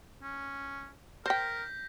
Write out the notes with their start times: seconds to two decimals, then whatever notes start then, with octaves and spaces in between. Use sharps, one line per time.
0.23 C#4
1.26 A#4 C5 G5 G6 A#6 B6